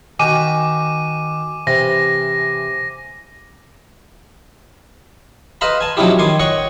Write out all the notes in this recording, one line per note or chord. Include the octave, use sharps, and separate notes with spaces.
D#3 F#4 G5 G#5 D6 D#7
C3 E3 C4 A#6
B4 C5 D#5 F5 A#5 B5
G#5 A5
F3 F#3 C#4 D#4 E4 G4
D#3 G#5 C6 D6
C#5 D#5 F#5 G5 C#6